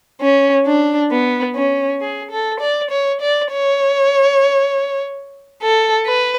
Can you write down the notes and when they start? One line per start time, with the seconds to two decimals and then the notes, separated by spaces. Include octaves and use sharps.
0.21 C#4
0.66 D4
1.11 B3
1.55 C#4
2.01 G#4
2.31 A4
2.60 D5
2.91 C#5
3.21 D5
3.51 C#5
5.62 A4
6.06 B4